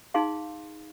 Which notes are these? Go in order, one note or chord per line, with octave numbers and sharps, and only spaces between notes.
D#4 G#4 F5 C6